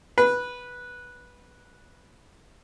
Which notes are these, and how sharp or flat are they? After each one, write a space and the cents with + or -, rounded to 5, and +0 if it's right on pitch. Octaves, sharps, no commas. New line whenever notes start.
B4 -10